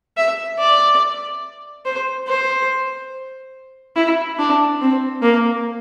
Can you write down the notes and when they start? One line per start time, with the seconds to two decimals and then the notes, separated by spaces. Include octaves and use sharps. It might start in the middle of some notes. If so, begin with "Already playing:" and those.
0.17 E5
0.59 D5
1.85 C5
2.27 C5
3.96 E4
4.39 D4
4.81 C4
5.22 A#3